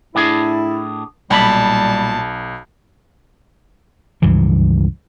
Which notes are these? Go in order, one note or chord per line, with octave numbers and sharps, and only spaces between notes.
A2 D4 E4 G#4
B1 A#2 G3 A5 B5
C#2 G2 E3 F3